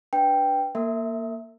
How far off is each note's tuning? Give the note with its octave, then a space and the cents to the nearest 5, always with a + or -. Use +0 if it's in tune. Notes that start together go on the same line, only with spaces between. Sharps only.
D4 +0 B4 +0 G5 +0
A#3 +0 A#4 -40 E5 +0